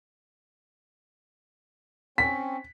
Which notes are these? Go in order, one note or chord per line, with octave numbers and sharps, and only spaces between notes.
C4 C#4 B6